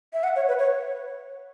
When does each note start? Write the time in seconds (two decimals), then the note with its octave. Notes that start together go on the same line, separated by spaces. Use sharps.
0.13 E5
0.24 F#5
0.36 C#5
0.48 B4
0.59 C#5